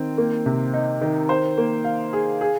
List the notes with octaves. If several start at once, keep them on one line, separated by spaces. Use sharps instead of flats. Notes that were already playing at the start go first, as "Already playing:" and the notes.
Already playing: D#3 C4
A#3
C3
D#4
D#3
C5
A#3
F5
G#4
G#4